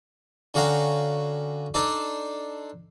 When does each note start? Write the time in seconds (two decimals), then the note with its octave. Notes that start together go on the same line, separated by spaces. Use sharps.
0.54 D3 C#4 F#4 F5 G5 A#5
1.74 D4 D#4 A4 C5 D5